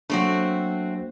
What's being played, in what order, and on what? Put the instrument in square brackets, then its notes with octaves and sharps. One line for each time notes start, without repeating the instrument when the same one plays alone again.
[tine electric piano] F#3 A#3 D4 [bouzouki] A3 C4 F#4